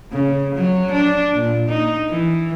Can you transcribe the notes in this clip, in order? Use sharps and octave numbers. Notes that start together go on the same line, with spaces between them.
C#3
F#3
D4
A#2
D#4
E3